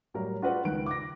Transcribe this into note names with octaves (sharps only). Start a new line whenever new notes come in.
A2 F#3 G3 A#4
F4 F#4 G#4 B4 D5 F#5
C#2 D#3 F#6 D7
D6 A#6